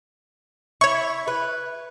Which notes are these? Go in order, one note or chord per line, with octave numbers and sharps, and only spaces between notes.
E4 C#5 C#6
B4